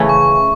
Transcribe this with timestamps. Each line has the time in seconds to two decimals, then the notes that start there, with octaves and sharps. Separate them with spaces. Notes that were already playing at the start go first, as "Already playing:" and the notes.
Already playing: C#3 E3 A3 C#4
0.09 C#6